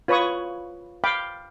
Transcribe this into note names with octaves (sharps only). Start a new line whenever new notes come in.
F4 B4 C#5 B5 C#6 D#6
F5 G5 B5 D6